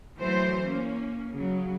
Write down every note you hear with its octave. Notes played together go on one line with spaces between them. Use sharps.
E3 F#3 A3 C5
A#3 C#4
C#3 F#3